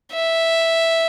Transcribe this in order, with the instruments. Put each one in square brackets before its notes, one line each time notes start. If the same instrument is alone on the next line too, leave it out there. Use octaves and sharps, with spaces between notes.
[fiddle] E5